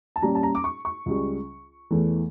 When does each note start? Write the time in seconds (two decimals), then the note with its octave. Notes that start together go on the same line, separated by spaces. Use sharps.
0.16 A5
0.22 A#2 G3 C#4 A#5
0.35 A5
0.43 A#5
0.55 D6
0.64 C#6
0.85 C#6
1.06 C#2 C#3 G3
1.90 E2 E3 A3